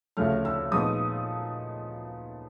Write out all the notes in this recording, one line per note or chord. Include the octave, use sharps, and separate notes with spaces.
D2 C#3 F3 A3 F6
E6
A#2 F3 G#3 B3 D#4 D#6